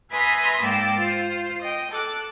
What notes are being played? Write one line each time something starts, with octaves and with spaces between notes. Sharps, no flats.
B4 E5 G#5 A#5 C6 D#6
G#2 A#3 D5 G5 E6 A6
F4 C5
D#5 G5
A4 D6 F#6